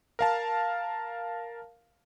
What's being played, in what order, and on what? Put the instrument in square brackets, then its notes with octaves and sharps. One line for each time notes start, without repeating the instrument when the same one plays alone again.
[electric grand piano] A#4 F5 A5